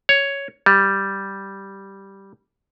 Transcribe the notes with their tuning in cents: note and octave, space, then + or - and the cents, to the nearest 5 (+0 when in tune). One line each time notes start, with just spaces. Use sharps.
C#5 +5
G3 -5